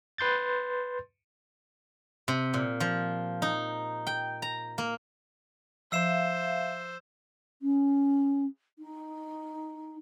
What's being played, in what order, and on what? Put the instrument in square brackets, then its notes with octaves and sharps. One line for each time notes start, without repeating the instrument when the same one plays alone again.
[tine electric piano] B4 C6 G6 A6
[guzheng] C3
A#2
F3
D#4
G5
A#5
A#3
[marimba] F3 [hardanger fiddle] C5 [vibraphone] E5 F5 [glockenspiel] E6 C7 E7
[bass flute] C#4
D#4